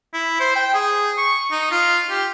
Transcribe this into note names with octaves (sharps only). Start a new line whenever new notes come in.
E4
C5
G5
G#4
C#6
D#4
F4
G4